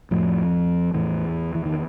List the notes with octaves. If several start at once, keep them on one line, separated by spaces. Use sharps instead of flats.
F2 A2 F3
E2 A2 E3
E3
D#3